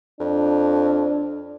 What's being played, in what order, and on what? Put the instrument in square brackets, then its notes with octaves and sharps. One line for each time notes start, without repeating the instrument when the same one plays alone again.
[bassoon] F2 [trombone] D4